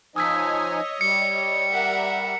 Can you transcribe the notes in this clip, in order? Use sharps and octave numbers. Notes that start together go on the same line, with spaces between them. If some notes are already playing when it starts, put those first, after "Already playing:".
F3 D#4 C#5 D#5 G#5 D#6 E6 B6
G3 C#7
A#4 E5 F#5